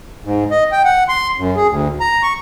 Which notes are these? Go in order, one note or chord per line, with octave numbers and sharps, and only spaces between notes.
G#2
D#5
G5
F#5
C6
F#2
G#4
D2
A#5
C#6